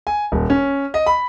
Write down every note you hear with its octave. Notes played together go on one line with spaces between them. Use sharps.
G#5
D#1
C#4
D#5
B5